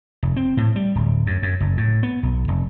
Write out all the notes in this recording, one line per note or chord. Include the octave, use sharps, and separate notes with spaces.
F1
C4
A2
G3
D1
F#2
F#2
F#1
A2
B3
B1
F1